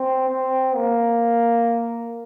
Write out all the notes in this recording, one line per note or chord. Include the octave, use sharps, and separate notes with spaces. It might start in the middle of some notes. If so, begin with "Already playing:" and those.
Already playing: C4
C4
A#3